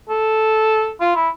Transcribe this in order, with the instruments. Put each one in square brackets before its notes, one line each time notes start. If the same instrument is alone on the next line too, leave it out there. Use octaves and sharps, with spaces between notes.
[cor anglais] A4
F4
E4